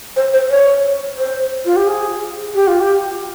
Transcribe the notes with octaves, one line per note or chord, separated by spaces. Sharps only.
C5
C5
C#5
C5
F4
G4
G#4
G4
F4
G4